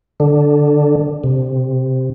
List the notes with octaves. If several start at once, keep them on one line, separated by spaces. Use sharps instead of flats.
D3
C3